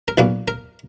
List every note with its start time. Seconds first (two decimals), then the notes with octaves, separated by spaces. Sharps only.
0.08 A#4
0.18 B1 A#2 A#3 B4
0.48 A#4